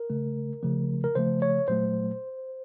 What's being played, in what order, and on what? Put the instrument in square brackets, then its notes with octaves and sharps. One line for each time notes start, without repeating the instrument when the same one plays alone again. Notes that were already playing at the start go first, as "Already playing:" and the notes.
Already playing: [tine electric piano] A#4
C#3 A3
C#3 F3 A3
A#4
C#3 F3 A3 C5
C#5
A#2 F#3 A3 C5